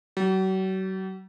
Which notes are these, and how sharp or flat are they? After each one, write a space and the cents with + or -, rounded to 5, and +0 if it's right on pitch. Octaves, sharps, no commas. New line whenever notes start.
F#3 +40